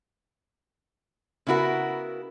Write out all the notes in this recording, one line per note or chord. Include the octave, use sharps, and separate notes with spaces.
C#3 B3 E4 F#4 A#4